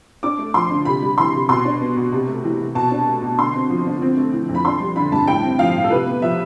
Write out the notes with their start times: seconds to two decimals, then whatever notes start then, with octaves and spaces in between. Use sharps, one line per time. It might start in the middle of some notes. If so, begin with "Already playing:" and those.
0.23 D4 D6
0.39 A3
0.54 F3 C6
0.71 D3
0.85 C3 B5
1.02 G3
1.18 E3 C6
1.33 C3
1.49 B2 C6
1.65 D4
1.81 B3
1.97 B2
2.12 C3
2.28 A3
2.44 E3
2.60 C3
2.75 B2 A5
2.91 D4
3.07 A3
3.22 B2
3.38 D3 C6
3.54 C4
3.70 F3
3.86 D3
4.02 C4
4.17 A3
4.32 E3
4.49 F2
4.55 B5
4.65 D4 C6
4.80 G3
4.96 D3 B5
5.12 G2 A5
5.27 A2 G5
5.43 C4
5.59 F3 F5
5.75 A2
5.84 A4
5.91 C3 B4
6.07 B3
6.22 F3 E5